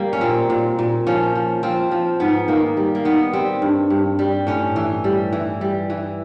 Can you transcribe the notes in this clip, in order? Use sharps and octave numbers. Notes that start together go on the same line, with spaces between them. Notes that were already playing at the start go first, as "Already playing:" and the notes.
Already playing: G3 A#3
C#4
A#2 C4
A#2
A#2
F3 C#4
F3
F3 C4
F3
G#2 B3
D#3 A#3
G3
A#3
D#3 B3
G3 C4
G2
G2
G3
A2 C#4
E3
G3
E3
G3
E3